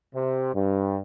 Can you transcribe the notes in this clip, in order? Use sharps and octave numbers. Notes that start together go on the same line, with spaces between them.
C3
G2